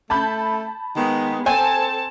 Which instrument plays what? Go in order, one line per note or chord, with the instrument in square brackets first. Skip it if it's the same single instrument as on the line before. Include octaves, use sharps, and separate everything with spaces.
[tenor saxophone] A3 [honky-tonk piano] A5 B5 G6
[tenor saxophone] D#3 [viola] G#3 B3
[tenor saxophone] C4 [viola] A4 A5 [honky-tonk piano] C5 [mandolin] G#5